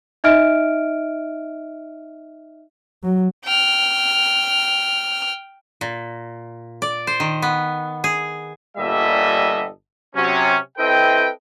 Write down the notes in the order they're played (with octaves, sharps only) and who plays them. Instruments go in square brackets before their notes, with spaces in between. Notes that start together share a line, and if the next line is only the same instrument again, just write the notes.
[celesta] D#4 D#5 E5 F6 D7
[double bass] F#3
[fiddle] G5 F6
[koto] A#2
D5
C5
D#3
B3
G#4
[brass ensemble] G1 A#2 G3 A4 D#5 E5
C3 F#3 C#4
C4 E4 A4 B4 D#5 G5